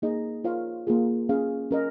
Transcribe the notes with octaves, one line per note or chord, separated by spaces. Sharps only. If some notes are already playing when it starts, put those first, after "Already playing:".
A#3 D#4 G#4 D#5
F4 A#4 C#5 F5
A#3 F4 G#4
C#4 G#4 F5
C#4 A#4 D#5